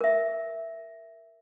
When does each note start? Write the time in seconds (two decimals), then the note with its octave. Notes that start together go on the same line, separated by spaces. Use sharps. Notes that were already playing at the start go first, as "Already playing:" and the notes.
0.01 A#4 E5